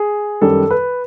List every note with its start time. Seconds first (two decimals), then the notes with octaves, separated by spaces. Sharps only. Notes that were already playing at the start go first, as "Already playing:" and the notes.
Already playing: G#4
0.42 F#2 D#3 G3 A4
0.71 B4